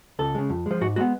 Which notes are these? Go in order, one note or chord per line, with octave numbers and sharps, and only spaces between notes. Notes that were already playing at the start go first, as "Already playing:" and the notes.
C#2 A4
C#3 G#3
F2
F3 G#3
G#2 F#4
G#3 B3 F#4